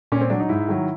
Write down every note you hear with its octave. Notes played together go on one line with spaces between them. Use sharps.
A#2 C#4
C4
F#3 D4
D#4
G#2 E4
D#3 F#3